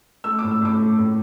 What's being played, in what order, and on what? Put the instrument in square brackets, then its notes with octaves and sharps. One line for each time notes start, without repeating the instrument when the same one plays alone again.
[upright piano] A3 E6
A2 D6
E6
A2 D6
A3
A2